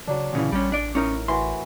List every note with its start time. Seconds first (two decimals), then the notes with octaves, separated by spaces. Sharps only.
0.07 C#3 F#3 D4
0.33 D2 A#2 C#3 E3 G#4
0.52 A1 G3 C#4
0.72 D4 D5
0.95 A2 C#4 D#4 A#4
1.28 E3 F#4 C6